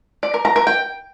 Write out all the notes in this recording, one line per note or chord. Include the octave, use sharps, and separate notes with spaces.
D5
A#4
A#5
A#4
G5